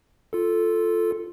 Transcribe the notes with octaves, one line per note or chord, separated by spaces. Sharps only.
F4 A4